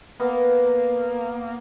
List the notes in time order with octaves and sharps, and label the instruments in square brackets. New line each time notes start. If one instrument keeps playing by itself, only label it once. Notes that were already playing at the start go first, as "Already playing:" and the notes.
[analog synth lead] A#3 [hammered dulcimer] B3